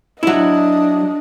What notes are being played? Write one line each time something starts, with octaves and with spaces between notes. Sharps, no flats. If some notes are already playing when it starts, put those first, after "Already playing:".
F#3 D4 E4 D#5